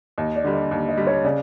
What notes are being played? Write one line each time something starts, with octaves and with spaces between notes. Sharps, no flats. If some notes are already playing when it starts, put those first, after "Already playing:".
D#2 D#5
D5
D3 G3
D#5
D#2
D#5
D3 G3
C#5
C#3 D5